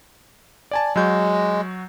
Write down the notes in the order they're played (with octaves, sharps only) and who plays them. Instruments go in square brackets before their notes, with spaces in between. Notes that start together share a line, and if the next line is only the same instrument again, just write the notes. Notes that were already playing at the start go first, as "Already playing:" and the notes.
[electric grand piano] D5 G#5 A5
[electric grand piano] F#3 F#4 G6 [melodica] G#3